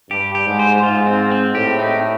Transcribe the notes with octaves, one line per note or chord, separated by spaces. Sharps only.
G2 G4
G4
G#2
C5
G#2 F4
C4
C4
A2 G4
D#4